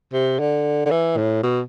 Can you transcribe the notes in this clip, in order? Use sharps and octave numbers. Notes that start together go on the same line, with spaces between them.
C3
D3
D3
E3
A2
B2